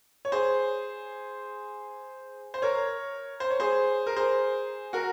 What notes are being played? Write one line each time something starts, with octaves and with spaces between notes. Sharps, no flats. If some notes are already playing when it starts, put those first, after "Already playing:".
C#5
G#4 C5
C5
A#4 C#5
C5
C#5
G#4 C5
A#4
G#4 C5
F#4 A#4